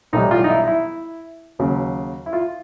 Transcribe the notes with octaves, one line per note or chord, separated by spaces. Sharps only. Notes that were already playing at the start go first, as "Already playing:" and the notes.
B1 A2 E3 G3 D#4
F4
D#4
E4
E4
D#2 C#3 F#3
E4
F4